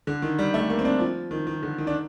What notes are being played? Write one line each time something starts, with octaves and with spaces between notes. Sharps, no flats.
D3
D#3
G3
A3
A#3
C4
D4
F3
D#3
D#3
D3
D#3
D4